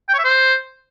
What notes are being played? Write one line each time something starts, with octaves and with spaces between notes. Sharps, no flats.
G5
C#5
E5
C5